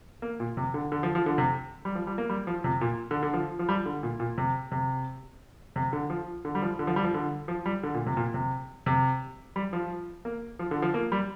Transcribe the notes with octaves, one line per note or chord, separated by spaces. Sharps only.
A#3
A#2
C3
D3
D3
F3
F3
D3
C3
G3
F3
G3
A#3
G3
F3
C3
A#2
D3
D3
F3
F3
G3
D3
A#2
A#2
C3
C3
C3
D3
F3
D3
G3
F3
D3
F3
G3
F3
D3
F3
G3
D3
A#2
C3
A#2
C3
C3
G3
F3
A#3
F3
D3
F3
A#3
G3